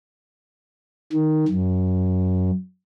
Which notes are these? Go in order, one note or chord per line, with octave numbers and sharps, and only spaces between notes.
D#3
F#2